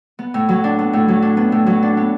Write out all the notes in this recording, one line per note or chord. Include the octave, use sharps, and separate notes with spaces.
B3
A2
F#3
D4
B3
A2
F#3
D4
B3
A2
F#3
D4
B3